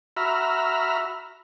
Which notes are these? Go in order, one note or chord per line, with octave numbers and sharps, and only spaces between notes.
F#4 E5 A#5 B5 F6